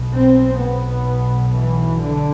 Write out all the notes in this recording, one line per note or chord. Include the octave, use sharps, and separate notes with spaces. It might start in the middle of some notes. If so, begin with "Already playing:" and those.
Already playing: B1 B2
C4
B3
E3
D3